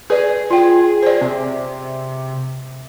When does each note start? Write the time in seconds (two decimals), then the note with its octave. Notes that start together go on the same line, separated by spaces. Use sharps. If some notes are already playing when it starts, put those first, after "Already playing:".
0.10 G#4 B4 D5
0.50 F4 G5
1.03 C5 D5
1.21 C3